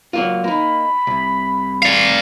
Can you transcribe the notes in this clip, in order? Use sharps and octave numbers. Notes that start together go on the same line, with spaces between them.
F#3 A#3 F4
A#3 D#4 B5
C2
D5 F5